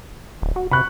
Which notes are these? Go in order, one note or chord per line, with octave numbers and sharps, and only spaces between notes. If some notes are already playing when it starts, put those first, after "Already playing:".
D1
F#4
C3 B5 C#6 F#6